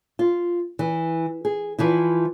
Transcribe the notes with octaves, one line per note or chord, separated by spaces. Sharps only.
F4
E3
G#4
E3 F3 E4